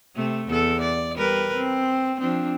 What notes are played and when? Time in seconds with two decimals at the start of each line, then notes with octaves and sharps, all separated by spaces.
0.16 C3 A3
0.48 E2 A4
0.81 D5
1.16 G3 A#4 B4
1.56 C4
2.20 F3 C4 D4